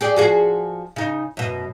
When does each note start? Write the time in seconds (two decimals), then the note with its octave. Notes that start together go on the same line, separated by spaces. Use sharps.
0.01 G4 G#4 D5
0.16 F3 F#4 G#4
0.96 C#3 D#4
1.37 F#2 B2